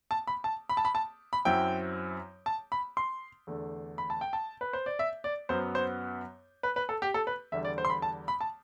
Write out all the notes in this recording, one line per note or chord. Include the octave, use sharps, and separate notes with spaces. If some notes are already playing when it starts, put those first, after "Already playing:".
A5
B5
A5
B5
A5
B5
A5
B5
F#2 F#3 C4 E4 G5
A5
B5
C6
E2 D3 A3
B5
A5
G5
A5
B4
C5
D5
E5
D5
F#2 F#3 B3 C5
C5
B4
B4
A4
G4
A4
B4
E2 D3 G3 E5
D5
C5
C6
B5
A5
B5
A5